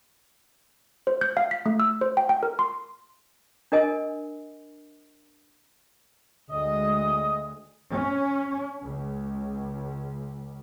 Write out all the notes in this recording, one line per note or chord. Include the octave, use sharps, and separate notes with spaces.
C5
G6
F5
B6
A3
E6
C5
G5
G5
A#4
C6
D4 A#4 D#5 G#5 D#6
D2 G#3 D#5 D#6
C#4
C#2